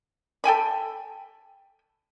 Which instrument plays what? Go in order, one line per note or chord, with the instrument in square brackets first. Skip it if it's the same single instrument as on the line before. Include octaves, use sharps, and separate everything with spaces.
[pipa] A4 G5 G#5 B5